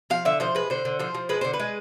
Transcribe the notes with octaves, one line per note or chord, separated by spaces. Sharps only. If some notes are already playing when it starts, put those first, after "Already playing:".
F3 F5
D3 E5
F3 C5
G#3 B4
D3 C5
D3
F3 C5
F3
G#3 B4
D3 C5
B4
G#3